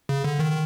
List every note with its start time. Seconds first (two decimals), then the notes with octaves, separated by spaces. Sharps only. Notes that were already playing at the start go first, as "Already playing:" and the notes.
0.09 C#3
0.24 D3
0.39 D#3